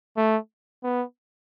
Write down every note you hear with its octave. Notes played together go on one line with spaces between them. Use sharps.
A3
B3